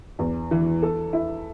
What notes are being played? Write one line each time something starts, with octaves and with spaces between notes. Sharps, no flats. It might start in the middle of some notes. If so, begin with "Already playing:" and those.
E2
E3
A4
E4